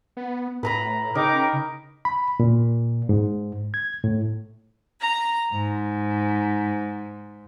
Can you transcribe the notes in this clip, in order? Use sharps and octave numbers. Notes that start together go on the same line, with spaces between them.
B3
A2 B4 A#5 B5
C#3 D#4 A#4 G5 D6
B5
A#2
G#2
G#6
A2
A#5
G#2